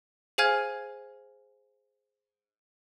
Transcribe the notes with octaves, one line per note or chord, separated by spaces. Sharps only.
G#4 C5 F5 G#5 F6 G#6